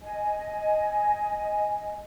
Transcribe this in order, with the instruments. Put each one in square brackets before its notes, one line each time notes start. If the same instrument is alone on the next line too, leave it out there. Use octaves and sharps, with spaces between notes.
[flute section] D#5 G#5